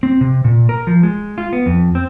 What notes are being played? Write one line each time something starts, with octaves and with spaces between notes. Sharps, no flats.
C4
C3
A#2
A#4
F3
G#3
F4
B3
F2
C4